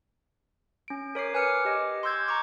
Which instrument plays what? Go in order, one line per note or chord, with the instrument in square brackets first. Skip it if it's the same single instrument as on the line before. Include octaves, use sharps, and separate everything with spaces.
[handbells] C#4 D7
A#4 C#5 D6 C7
B4 G#5 D6 F6 C#7
G4 D#5
C6 D6 E6 G6 G#6
A#5 C#6 D6